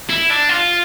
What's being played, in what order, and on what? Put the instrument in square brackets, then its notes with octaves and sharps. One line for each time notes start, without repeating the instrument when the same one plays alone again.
[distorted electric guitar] E4
D4
F4